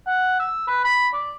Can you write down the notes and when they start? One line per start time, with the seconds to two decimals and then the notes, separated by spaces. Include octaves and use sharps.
0.07 F#5
0.40 E6
0.68 B4
0.84 B5
1.13 D5